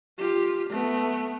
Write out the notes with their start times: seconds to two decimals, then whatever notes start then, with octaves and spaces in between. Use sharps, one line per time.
0.18 F4 G4
0.70 A3 B3